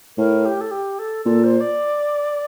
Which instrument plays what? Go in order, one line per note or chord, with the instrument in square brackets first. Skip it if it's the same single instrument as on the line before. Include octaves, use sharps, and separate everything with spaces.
[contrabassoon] A2 [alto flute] A#4
[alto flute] G4
A4
G4
A4
[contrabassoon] A#2 [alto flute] A4
[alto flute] C5
D5